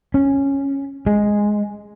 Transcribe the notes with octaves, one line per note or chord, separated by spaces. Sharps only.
C#4
G#3